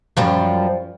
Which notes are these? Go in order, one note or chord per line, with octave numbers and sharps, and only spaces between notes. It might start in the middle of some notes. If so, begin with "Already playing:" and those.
F#2 F3 G3